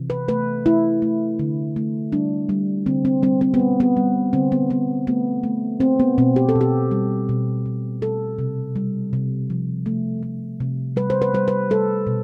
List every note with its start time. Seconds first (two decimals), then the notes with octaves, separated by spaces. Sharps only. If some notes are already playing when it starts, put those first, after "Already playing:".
Already playing: C3 E3
0.10 B4
0.28 A3 B4
0.66 A3 E4
1.02 A3
1.39 D3
1.76 A3
2.12 G3 D4
2.49 G3
2.86 D3 C4
3.05 C4
3.22 G3 C4
3.41 C4
3.54 B3
3.59 G3
3.80 B3
3.97 G3
4.33 D3 C4
4.52 B3
4.70 G3 B3
5.07 A3 B3
5.44 A3
5.80 A3 C4
6.00 B3
6.18 B2 C4
6.36 G4
6.49 A4
6.55 B2
6.61 G4
6.91 G3
7.29 B2
7.66 B2
8.02 G3 A4
8.39 C3
8.76 G3
9.13 C3
9.50 F3
9.86 A3
10.23 A3
10.60 C3
10.96 G3 B4
11.10 C5
11.22 B4
11.34 G3 C5
11.48 B4
11.70 G3 A4
12.07 B2